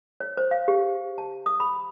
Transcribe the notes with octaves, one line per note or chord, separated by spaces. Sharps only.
C#5
C5
F5
G4
A5
D#6
B5